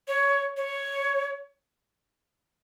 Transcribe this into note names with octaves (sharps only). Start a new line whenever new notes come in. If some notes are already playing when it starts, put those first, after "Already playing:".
C#5
C#5